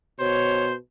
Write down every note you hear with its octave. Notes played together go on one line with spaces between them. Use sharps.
B2 C5 C#5